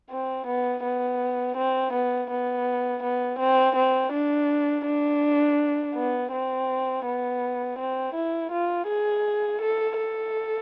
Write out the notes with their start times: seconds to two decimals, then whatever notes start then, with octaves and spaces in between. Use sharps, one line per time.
0.10 C4
0.47 B3
0.84 B3
1.57 C4
1.93 B3
2.30 B3
3.03 B3
3.39 C4
3.76 C4
4.12 D4
4.86 D4
5.95 B3
6.32 C4
7.05 B3
7.79 C4
8.15 E4
8.52 F4
8.88 G#4
9.61 A4
9.98 A4